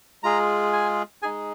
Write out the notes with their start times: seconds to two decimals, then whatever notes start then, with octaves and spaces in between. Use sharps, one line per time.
0.24 G#3 F4 G#4 A#5
0.73 G#5
1.22 G#3 D#4 G#4 G#5